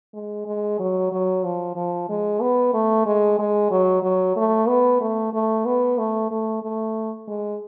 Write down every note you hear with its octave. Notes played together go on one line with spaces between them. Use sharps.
G#3
G#3
F#3
F#3
F3
F3
G#3
B3
A3
G#3
G#3
F#3
F#3
A3
B3
A3
A3
B3
A3
A3
A3
G#3